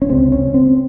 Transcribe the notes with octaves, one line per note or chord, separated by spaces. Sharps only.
C#4
C#2 C3 C4
C#4
C4